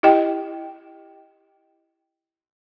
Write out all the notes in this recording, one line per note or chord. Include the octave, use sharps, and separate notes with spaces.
E4 G4 D#5 G5